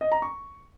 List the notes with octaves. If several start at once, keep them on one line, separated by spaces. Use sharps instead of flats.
D#5
A#5
C#6